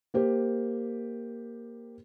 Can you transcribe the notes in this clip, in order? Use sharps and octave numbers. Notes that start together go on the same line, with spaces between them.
A#3 G4 C5